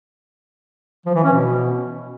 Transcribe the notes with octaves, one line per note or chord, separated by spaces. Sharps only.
F3
E3
C#4
B2